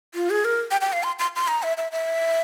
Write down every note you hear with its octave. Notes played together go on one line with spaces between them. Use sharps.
F4
G#4
A#4
G5
G5
F5
C6
C6
C6
A#5
E5
E5
E5